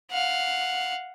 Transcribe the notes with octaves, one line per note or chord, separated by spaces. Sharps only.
F5 F#5